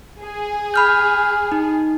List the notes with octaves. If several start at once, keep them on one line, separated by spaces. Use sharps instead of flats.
G#4
B5 F6 G6
D#4